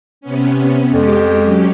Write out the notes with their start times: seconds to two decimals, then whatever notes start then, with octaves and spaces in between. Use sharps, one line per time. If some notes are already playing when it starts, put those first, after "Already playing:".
0.21 C3 B3 C#4
0.93 F2 G#3 G4
1.42 F#3 C#4 G4